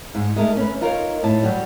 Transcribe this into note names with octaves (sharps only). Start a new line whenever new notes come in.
G#2
G#3 A3 A#4
C#4 B4
D#4 F4 A#4 C#5
A2 A5
F#3 G3